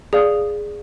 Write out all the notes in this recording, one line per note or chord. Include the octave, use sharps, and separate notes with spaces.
G#4 D5 F5 D#6